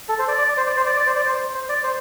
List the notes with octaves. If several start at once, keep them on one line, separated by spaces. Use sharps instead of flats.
A4
C5
D5
D5
D5
C5
D5
C5
D5
D5
C5
D5
C5
C5
D5
C5